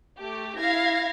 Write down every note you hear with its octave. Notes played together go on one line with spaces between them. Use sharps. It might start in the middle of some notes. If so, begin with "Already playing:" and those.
A3 G4
E4 F5 G#6 A#6